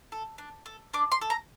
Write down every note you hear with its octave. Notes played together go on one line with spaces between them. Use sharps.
A4
D4
A4
D4 D6
C6
A4
A#5